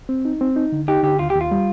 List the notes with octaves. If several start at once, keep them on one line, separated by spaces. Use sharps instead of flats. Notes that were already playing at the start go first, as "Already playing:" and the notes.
C4
D#4
C4
D#4
D3
D#4 G4
D3 G4
D#2 F4
G4
D#2
F4
G3